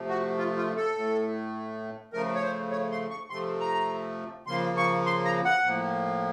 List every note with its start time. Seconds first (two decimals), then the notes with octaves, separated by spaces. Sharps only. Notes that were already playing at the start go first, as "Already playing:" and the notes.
Already playing: C3 F3 A3
0.09 F#4
0.38 F4
0.57 F4
0.76 A4
0.96 A2 A3
2.13 C#3 F3 A3 A#4
2.35 C#5
2.42 C5
2.71 C#5
2.92 C6
3.10 C#6
3.30 C3 F3 A3 C6
3.60 A#5
4.47 C#3 F3 A#3 C6
4.77 C#6
5.06 C6
5.25 A#5
5.45 F#5
5.64 A2 F3 A#3